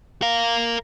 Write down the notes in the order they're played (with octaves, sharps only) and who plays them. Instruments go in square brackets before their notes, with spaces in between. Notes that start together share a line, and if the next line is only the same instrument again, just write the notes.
[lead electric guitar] A#4 F5